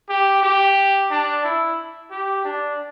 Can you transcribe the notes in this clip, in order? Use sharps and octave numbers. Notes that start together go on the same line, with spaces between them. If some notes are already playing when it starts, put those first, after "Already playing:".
G4
G4
D4
E4
G4
D4